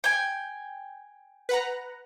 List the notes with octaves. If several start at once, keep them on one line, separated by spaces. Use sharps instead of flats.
G5 G#5
B4 F#5 A#5